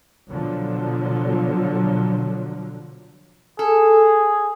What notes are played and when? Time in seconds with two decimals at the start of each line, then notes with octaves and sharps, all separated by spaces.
0.29 B2 D3 F3 F#3
3.59 G#4 A4